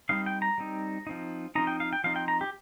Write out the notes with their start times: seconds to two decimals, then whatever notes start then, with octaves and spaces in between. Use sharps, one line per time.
0.09 G3 C4 D#4 F5
0.26 G5
0.42 A#5
0.58 G3 C4 D#4
1.07 F3 C4 D#4
1.55 F3 C4 D#4 A#5
1.67 G5
1.80 F5
1.93 G5
2.04 F3 C4 D#4 F5
2.16 G5
2.28 A#5
2.41 G4